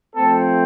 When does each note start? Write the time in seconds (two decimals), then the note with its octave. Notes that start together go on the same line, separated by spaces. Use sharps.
0.15 F3 A3 C4 A4